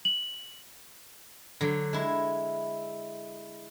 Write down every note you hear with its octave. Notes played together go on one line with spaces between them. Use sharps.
F#7
D3 F#3
G#3 E4